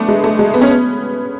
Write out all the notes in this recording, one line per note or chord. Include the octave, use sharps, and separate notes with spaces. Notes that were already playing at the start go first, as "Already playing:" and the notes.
Already playing: A3 B3 D4
G#3
A3
G#3
B3
C#4
B3